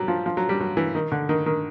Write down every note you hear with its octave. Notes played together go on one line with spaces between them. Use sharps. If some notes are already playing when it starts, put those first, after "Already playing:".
Already playing: F#3 G3
F3
F3
F#3
G3
F#3
E3
D#3
D3
D#3
D#3